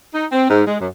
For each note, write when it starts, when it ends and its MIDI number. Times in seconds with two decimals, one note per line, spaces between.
0.13 0.25 63
0.32 0.49 60
0.49 0.62 44
0.66 0.78 56
0.79 0.88 42